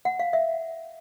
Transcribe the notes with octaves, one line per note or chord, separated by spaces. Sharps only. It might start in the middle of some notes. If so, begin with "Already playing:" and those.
F#5
F5
E5